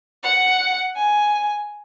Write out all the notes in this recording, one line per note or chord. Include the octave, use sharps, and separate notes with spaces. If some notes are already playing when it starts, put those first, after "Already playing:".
F#5
G#5